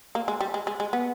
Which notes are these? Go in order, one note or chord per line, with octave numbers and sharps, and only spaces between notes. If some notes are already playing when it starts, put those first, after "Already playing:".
A#3
G#3
G3
G#3
G#3
G#3
B3